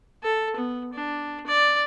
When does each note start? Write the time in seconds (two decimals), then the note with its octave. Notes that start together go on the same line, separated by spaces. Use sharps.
0.23 A4
0.56 B3
0.94 D4
1.47 D5